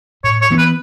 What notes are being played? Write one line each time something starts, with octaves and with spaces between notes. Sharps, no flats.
A2 C#5
C#5
E3 B3
B4